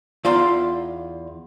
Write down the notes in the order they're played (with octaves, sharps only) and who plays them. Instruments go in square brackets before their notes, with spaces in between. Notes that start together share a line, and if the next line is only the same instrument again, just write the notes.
[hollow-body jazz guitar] E2 D#4 F4 D5 C6